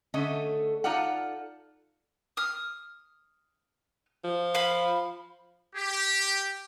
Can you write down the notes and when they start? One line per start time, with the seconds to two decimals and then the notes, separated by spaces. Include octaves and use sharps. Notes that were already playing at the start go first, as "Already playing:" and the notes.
0.14 D3 A3 C#4 A4 D#5
0.84 D#4 F4 A4 D5 F5 F#5
2.37 D#6 F6
4.25 F3
4.54 F5 B5
5.76 G4